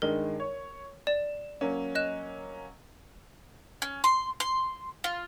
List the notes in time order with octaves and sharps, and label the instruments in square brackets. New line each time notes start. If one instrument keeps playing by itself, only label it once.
[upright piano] G2 D#3 G#3 [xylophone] A#4
[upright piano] C#5
[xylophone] D5 [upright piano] E7
[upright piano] F#3 A#3 C#4
[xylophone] D#5 F#6 E7
[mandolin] C#4
C6
C6
F4